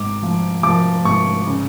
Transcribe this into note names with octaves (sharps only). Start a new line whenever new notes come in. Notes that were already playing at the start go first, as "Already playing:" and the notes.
Already playing: G#1 D6
F3
F3 D6
G#1 C#6
C#3